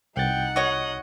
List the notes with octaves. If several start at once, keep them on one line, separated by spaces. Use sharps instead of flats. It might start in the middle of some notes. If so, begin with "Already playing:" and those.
C2 D#4 F#5 G5 A6
F#4 C#5 D#5